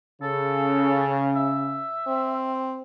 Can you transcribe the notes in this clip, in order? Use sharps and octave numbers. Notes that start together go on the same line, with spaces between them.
C#3 A4
E5
C4